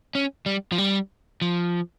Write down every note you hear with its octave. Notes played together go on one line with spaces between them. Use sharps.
C#4
G3
F3
G3
F3